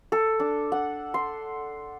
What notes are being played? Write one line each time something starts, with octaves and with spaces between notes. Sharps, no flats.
A4
D4
F#5
C6